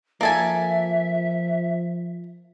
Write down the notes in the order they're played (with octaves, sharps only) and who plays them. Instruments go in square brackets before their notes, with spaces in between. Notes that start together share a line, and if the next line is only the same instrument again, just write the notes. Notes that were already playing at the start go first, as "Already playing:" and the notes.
[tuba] F3 [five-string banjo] A#3 A4 G#5 [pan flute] E5